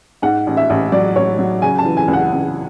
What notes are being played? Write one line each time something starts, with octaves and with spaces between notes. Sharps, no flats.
G#2 F#5
A1
E5
A1
F#3 D5
A1 C#5
F#3
C#3 G#5
A5
E3
G#5
C#2
F#5
C#2